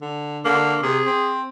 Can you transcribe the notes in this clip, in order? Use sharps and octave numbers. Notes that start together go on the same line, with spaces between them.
D3
D3 A#3
C3 G#4
C4